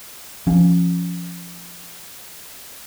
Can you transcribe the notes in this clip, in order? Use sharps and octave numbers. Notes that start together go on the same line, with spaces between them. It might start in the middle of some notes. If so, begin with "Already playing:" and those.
F3 C#4